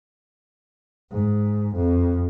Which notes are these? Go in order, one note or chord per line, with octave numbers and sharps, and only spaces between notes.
G#2
F2